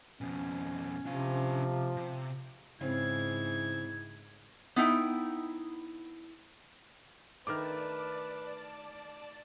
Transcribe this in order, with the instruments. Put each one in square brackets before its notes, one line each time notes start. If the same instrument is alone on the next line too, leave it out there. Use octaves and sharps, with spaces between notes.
[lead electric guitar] F2 B2 [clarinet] C#4
[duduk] C3 [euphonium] F3 [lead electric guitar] D4 F5
[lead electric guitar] C3
[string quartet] G#2 [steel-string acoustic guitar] C#3 C4 F5 [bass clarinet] E4 [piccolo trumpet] G#6
[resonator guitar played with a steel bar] B3 D#4 E4 G5
[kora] D#3 A3 D4 [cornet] B4 [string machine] D5 A5 [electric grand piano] D6 F6